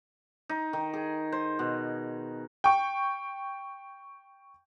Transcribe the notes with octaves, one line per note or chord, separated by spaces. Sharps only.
D#4
D#3
G#4
C5
B2
G5 C#6